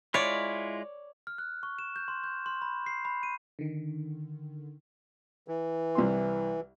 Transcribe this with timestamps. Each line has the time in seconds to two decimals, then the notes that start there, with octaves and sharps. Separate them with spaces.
0.14 G#3 E4 F4 C#5 D5
1.27 F6
1.38 F#6
1.63 C#6
1.79 E7
1.96 G6
2.08 C6
2.24 G6
2.46 C6
2.62 B5
2.86 C7
3.05 B5
3.23 D#7
3.59 D3 D#3
5.48 E3
5.95 C2 C4 C6